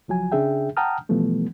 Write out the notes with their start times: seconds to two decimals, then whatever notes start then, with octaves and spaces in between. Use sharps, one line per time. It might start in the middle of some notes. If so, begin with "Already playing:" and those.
0.08 C#2 F3 F#3 G#5
0.32 C#3 D4 G#4 E5 G5
0.77 F#5 G5 A5 A#5 D#6 F6
1.09 B2 E3 F3 G3 A3 B3